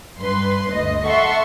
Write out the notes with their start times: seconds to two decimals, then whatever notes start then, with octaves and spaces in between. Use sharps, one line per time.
0.20 G2 B4 C6
0.71 D2 D#5
1.06 A4 E5 F#5 C6 C#6